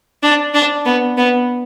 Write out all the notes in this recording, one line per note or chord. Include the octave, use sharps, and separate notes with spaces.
D4
D4
B3
B3